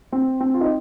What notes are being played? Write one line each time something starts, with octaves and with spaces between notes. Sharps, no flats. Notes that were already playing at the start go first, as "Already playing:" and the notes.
C4
C4
F4
D#4